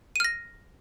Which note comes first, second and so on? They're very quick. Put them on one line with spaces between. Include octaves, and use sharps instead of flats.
D#7 F6 A#6